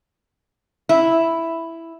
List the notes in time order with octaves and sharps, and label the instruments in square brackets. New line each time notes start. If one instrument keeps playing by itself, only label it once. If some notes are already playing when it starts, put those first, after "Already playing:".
[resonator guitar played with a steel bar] E4